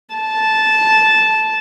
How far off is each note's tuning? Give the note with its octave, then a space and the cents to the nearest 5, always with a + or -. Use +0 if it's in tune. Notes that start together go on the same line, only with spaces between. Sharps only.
A5 -10